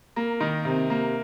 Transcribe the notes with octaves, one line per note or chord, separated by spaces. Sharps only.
A#3
D#3
C3
A#3